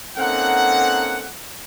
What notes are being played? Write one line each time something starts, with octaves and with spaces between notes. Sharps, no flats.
A#3 C4 C#4 D#4 A4 F#5